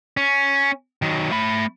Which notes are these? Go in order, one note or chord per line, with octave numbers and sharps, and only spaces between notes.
C#4
D#3 F#3
A3 B5